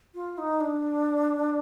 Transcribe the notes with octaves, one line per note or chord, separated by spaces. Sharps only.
F4
D#4
D4